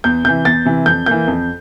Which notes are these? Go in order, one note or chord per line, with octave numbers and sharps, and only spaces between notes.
E2 G6
C3 E3 G6
E2 A6
C3 E3
F2 G6
E3 A#3 G6
F2